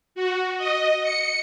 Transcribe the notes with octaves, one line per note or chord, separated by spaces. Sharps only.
F#4
D#5
C#7